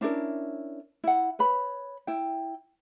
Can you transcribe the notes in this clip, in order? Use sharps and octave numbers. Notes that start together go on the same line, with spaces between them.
C#4 D4 E4 A#4
E4 F#5
B4 C#5 B5
E4 G5